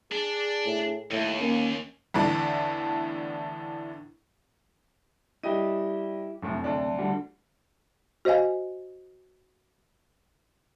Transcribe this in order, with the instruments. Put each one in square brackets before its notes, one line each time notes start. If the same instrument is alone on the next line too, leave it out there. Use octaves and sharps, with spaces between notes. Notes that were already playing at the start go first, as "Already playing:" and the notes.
[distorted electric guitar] D4 [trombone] G#4
[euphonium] A2
[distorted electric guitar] D#2 [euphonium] A2
[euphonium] A#3 [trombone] C#4
[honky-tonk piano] E2 A2 D3 D4
[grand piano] G3 D#5 D#7 [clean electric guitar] E4 G4
[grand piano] F1 A2 [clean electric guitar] F#2 C3
[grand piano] D2 D4
[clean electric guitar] D3 G3 F#4
[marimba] F#4 C5 D#5 F5 G#5